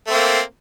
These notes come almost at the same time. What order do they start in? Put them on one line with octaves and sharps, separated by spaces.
A3 C4 A#3